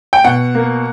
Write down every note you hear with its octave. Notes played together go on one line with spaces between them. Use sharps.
G5
B2 F#5
A#3